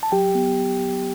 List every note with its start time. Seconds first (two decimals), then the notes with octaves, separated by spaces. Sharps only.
0.03 A5
0.12 F#3 G4 G5
0.35 B3